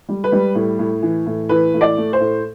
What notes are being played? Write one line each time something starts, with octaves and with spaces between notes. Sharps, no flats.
G3
B4
G3
A2
A2
E3
A2
E3 B4
A2
D5
A3
C5
A2